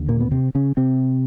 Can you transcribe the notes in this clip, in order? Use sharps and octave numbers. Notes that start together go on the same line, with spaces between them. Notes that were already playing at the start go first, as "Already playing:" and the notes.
Already playing: D#2 D3
A#2 A#3
B3
C3 C4
C#3 C#4
C3 C4